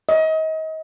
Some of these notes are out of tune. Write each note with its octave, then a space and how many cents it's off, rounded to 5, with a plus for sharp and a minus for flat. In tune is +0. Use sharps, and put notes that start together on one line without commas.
D#5 +30